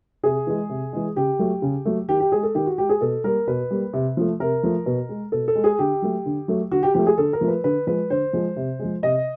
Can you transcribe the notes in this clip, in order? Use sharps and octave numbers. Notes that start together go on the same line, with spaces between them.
C3 G#4
E3 G#3
C3
E3 G#3
C#3 G4
F#3 A3
C#3
F#3 A3
D#3 G4
G4
G#3 G#4
A4
D#3 G4
F#4
G#3 G4
G#4
B2 A4
G3 A#3 A#4
B2 B4
G3 A#3
C3
F3 A3
C3 A#4
F3 A3
B2
G#3
B2 A4
A4
G#3
G#4
D3 G4
F#3 A3
D3
F#3 A3
D3 F#4
G4
F3 A3 G4
G#4
D3 A4
A#4
F3 A3
B4
D3 B4
F3 G#3 B4
D3 C5
F3 G#3
C3
F3 G#3
C3 D#5